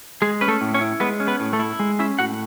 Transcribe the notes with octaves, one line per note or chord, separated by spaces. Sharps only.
G#3 G#4
C#4 B4
A3 A4
A2
C#4 C#5
E4
G#3 B3 B4
C#4
B3 B4
A2
A3 A4
E4
G#3
C#4 E4 E5
A2 F#4 F#5